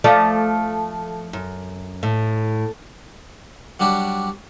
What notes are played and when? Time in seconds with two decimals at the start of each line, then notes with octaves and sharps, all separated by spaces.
0.04 F3 A3 D5
1.33 F#2
2.03 A2
3.80 F#3 G3 D4 F#4 G4